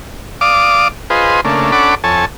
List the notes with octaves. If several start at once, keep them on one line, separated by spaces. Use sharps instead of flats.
D5 F5 D6 D#6
F4 G#4 B4 C5 D#5
C#3 A3 A#3 D4
C#4 D4 A4 F#5 B5 D6
F2 A4 C#5 G#5 A5